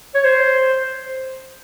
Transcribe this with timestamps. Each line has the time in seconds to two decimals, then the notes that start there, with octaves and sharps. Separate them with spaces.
0.15 C#5
0.24 C5